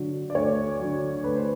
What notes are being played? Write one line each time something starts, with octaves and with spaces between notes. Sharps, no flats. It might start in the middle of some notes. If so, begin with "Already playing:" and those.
Already playing: D3 F#3
D5
D2 C#5
D3 F#3
D2 B4
C5